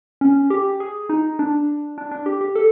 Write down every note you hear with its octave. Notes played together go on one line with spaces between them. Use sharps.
C#4
G4
G#4
D#4
D4
D4
D4
G4
G4
A4